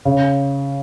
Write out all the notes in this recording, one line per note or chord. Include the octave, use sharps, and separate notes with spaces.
C#3